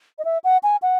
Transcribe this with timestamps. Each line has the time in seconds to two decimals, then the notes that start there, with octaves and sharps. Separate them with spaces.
0.19 D#5
0.25 E5
0.44 F#5
0.63 G#5
0.82 F#5